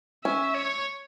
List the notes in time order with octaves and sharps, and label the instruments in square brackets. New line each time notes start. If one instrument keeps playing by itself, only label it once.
[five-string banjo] C#4 [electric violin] E5
[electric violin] C#5